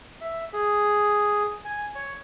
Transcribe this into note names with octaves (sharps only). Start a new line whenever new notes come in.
E5
G#4
G#5
C#5